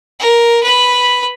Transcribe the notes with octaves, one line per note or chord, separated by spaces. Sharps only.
A#4
B4 B5